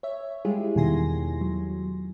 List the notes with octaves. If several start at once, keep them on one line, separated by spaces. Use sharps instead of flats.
C#5 E5
G3 G#3 E4 F4 G4 G#4
E2 B2 D#3 G#5 C6 A#6
F#3